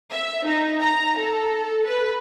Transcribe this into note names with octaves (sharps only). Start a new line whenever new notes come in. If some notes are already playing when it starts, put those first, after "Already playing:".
E5
D#4
A#5
A4
B4